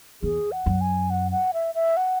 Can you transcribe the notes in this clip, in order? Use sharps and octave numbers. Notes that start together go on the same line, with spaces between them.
E2 G#4
F#5
F#2
G#5
F#5
F#5
E5
E5
F#5